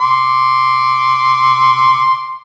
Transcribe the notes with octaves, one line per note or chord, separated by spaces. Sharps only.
C6 D6